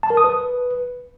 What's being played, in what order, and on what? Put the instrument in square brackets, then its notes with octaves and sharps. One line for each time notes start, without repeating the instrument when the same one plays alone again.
[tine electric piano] A5
A#4
D#6
B4